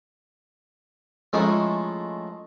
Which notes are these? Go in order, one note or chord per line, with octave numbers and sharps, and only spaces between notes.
F3 G#3 A3 C#4 D#4 E4